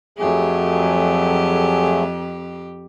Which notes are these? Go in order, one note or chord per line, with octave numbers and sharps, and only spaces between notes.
F2 F#3 A3 G4 G#4